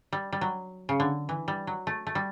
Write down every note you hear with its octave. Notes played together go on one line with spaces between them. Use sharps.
G3
G3
F#3
C#3
D3
E3
G3
F#3
A3
A3
G3